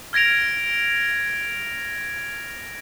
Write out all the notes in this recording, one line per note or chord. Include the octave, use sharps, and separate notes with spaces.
F6 G#6 A#6 D7 F7